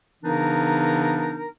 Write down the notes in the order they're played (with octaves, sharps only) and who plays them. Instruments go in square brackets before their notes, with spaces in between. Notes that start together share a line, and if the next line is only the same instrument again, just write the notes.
[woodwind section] C#3 E3 B3 D4 D#4 A#4